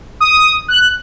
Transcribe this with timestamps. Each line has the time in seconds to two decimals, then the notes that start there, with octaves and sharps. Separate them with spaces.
0.20 D#6
0.68 F#6